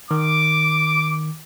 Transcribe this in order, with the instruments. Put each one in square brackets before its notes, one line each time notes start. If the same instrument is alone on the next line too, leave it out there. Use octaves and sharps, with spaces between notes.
[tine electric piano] D#3 [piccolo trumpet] D6